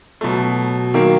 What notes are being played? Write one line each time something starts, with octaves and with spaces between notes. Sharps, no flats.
B2 F#3 A3
D#3 F#3 A#3